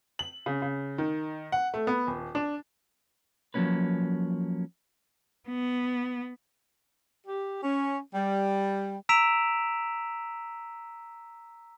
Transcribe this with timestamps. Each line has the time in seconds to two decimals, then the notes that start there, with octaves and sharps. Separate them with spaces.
0.19 F#7
0.46 C#3
0.62 C#3
0.98 D#3
1.52 F#5
1.74 A3
1.87 B3
2.07 D#1
2.35 D4
3.54 F3 F#3 A#3 C#4 B4
5.48 B3
7.27 G4
7.63 C#4
8.14 G3
9.09 A#5 E6 B6 D7 E7 F7